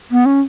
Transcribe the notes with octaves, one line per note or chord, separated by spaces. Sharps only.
B3
C#4